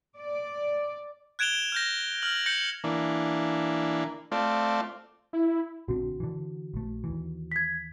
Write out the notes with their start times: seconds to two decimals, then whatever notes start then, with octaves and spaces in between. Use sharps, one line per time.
0.18 D5
1.39 F#6 G#6 D7 E7 F7 G7
1.72 F6 G6 A#6
2.22 F6 F#7
2.46 G6 A#6 C#7 F#7
2.84 E3 A#3 D4
4.32 A3 C4 F4 D5
5.33 E4
5.88 A#1 D3 C4 F#4
6.20 D3 E3
6.74 A#1 A3
7.04 D#2 E3
7.52 G#6 B6